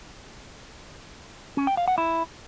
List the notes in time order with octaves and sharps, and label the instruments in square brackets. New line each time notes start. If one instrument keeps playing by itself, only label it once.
[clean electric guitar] C#4
G5
F5
F#5
E4